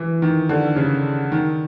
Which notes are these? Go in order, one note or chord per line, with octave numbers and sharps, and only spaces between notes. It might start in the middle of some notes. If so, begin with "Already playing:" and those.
Already playing: E3
D#3
D3
C#3
D#3